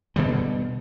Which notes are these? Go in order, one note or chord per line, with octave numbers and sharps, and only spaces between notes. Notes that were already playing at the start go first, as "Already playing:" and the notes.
B2 D3 G3